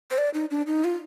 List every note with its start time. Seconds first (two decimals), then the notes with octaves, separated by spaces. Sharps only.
0.11 C5
0.18 D5
0.34 D#4
0.51 D4
0.67 D#4
0.84 F4